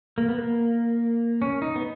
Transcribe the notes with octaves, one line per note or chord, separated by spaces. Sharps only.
A#3
B3
A#3
C#4
D#4
B3